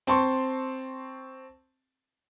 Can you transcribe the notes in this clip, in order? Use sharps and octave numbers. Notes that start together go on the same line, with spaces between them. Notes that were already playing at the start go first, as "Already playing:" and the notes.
C4 A5 C6 C#6